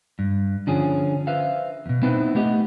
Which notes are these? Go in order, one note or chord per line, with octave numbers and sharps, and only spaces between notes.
G2
D3 F3 C#4 D4 G#4
B4 C5 E5 F5
E2 B2
B3 C4 D#4 E4 B4 C5
A3 B3 G4 D#5